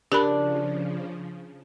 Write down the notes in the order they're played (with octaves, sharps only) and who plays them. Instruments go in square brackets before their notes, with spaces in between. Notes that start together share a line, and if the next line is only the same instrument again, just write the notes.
[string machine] C#3 F3 [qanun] D4 [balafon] G4 A#4 B5